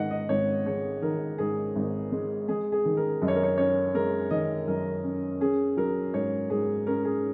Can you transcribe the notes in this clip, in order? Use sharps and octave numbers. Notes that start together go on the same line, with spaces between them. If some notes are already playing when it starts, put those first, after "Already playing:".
Already playing: G#2 D#3 D#5 F#5
D#5
G#1 C#5
G#3 C#5
D#3 A#4
G#2 G#4
G#1
G#3
G#3 G#4
G#4
D#3
A#4
F#2 D#5
C#5
A#4
C#5
C#4 C#5
G#3 A#4
D#3 D#5
F#2 A#4
C#4
C#4 G#4
F#3 A#4
G#2 C#5
G#2 G#4
C#4 A#4
G#4